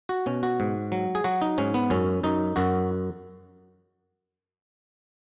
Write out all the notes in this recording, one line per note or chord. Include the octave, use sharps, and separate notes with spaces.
F#4
B2 C#4
F#4
G#2
F#3
G#4
F#3 F#4
D#4
G#2 C#4
B3
F#2 C#4
F#2 D#4
F#2 F#4